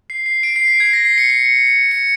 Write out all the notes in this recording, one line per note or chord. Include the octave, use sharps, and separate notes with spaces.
C7
C7
D7
C7
B6
G#6
A#6
C7
C#7
C#7
C#7
C#7